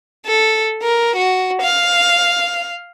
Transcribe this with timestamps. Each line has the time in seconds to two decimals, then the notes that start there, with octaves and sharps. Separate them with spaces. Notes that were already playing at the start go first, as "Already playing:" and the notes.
0.26 A4
0.82 A#4
1.16 F#4
1.62 F5